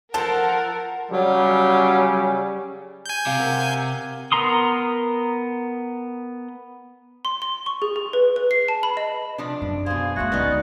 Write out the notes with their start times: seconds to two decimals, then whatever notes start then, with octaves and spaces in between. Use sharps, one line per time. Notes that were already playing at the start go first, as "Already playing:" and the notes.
0.14 F3 A4 A#4 F#5 A5
1.11 C#3 F#3 G3 C#4
3.06 G#5 G6
3.26 C3 F5
3.39 A#4 F#5
4.32 B3 A#4 A#5 C6 D#6
7.25 C6
7.42 C6
7.66 C#6
7.82 G#4
7.96 G#4
8.13 B4
8.36 B4
8.51 C7
8.68 A5
8.83 B5
8.97 D#5
9.38 C3 F3 D4
9.62 F#2
9.86 B2 G#4 C5 F5
10.16 D#2 G#3 F#4 E5 C6
10.32 C#2 D3 B3 C#4 D#4 D5